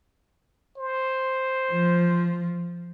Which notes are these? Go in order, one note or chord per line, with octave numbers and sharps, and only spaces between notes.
C5
F3